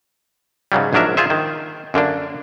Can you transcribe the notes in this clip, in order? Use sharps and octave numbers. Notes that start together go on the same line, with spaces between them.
G#2 C#3 F#3 G3
A#1 G#2 F#3 D4 A#4 E5
F4 G#4 C5 E5
D#3
F#2 D3 A#3 D4